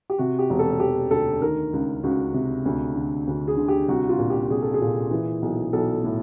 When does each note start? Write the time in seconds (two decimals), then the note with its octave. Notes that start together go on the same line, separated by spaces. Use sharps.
0.10 G4
0.18 C3 F#4
0.39 G4
0.50 E1
0.59 A4
0.80 E1 G4
1.11 D2 A4
1.42 D#3 A#4
1.73 C#2
2.03 C#2 F#4
2.34 C3
2.66 D2
2.95 D3
3.27 D2
3.48 G#4
3.57 D3
3.68 G4
3.88 C2 F#4
4.09 F4
4.19 A#2
4.30 G4
4.50 C2 G#4
4.62 A4
4.74 G#4
4.81 A#2
5.11 E3
5.42 B1
5.73 B1 A4
6.04 A2